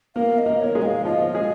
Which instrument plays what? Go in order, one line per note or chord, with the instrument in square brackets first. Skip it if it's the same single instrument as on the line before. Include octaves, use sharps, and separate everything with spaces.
[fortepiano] A#3 A#4 [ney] F5
[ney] D#5
[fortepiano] A#3 A#4
[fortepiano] A#4 [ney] C#5
[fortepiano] G#3 G#4
[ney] G#5
F5
[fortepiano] F3 F4 [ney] D#5
[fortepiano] G#3 G#4